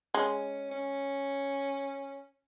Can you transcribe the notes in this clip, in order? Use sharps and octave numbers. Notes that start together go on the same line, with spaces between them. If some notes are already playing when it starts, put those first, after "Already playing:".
G#3 C#4
C#4